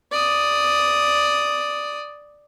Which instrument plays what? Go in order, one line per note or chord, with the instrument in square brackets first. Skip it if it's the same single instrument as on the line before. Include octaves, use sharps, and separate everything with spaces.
[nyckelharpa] D5 D#6